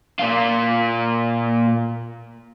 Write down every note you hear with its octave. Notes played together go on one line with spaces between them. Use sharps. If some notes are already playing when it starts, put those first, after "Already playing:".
A#2 F4